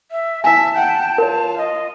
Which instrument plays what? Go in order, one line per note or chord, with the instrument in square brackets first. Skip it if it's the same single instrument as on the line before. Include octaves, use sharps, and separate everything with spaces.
[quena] E5
[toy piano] E4 G#5 [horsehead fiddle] E5 [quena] A5
[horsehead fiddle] F#5 G5
[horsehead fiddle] F4 [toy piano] A#4 C#5
[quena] D#5